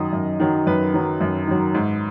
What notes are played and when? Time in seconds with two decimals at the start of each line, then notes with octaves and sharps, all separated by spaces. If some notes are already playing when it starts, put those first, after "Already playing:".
Already playing: F#2 D#3 F#3 D#5
0.13 F#2
0.40 D#3 F#3
0.66 F#2 B4
0.94 D#3 F#3
1.21 F#2
1.47 D#3 F#3
1.74 G#2